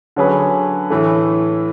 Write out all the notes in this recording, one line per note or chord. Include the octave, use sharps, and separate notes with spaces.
D3 F#3 C#4 G#4 B4
A2 E3 A3